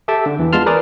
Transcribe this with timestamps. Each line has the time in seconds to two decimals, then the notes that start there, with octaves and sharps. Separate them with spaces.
0.08 G4 A4 E5 G5 A5 D6
0.26 D3
0.39 E2 E3
0.53 G#3 B3 F4 A5 C6 F6
0.66 A#4 B4 D5 G#5 D6 D#6